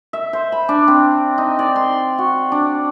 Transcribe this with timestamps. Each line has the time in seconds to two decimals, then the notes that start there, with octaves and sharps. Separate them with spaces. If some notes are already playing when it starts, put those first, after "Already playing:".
0.13 E5
0.33 C5
0.52 B5
0.69 D4
0.88 C4
1.38 D#4
1.59 D5
1.76 C6
2.18 F#4
2.52 D4